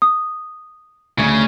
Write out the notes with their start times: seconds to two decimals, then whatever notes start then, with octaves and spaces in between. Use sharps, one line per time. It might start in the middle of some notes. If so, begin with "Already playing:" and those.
0.02 D#6
1.18 D2 C#3